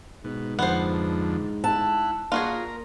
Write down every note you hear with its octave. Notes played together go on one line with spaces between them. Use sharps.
G#2 B2
F2 D3 B3 C5
E4 F#5 A5
A#2 F4 F#4 G#4 A#4